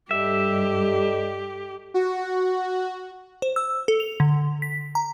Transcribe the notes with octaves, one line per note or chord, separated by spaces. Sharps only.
G2 G3 G4 A4 D#5 E5
F#4
C5
E6
A4
F7
D3
B6
A#5